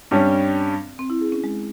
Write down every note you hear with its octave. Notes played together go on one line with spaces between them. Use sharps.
G2 G3 C4 C#4
C4
E4
G#4
C#4
G#3